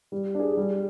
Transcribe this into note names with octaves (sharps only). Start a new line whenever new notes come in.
G3
D4 G#4
G3